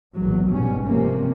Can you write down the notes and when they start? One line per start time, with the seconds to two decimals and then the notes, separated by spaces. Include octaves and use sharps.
0.15 A#1 E2 A2 F#3
0.48 G1 G#2 B2 G3 C#4
0.85 C3 F3 G3 A#3 C#4